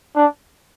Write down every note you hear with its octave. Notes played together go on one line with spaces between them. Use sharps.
D4